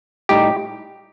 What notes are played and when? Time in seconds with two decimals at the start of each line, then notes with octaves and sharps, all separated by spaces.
0.29 A2 G3 D#4 G4